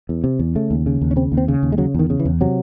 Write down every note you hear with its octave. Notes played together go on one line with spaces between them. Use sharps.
E2
C3
E2
C#3 A3
D#2
C#3
D#2
C#4
C#3 C4
D#2
C4
C#3
D#2
G#3
C#3 F#3
E2 D#3
C#3
E3
E2
C3 F#3